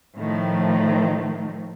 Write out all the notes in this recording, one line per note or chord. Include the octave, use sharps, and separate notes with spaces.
A2 D#3 F3 A3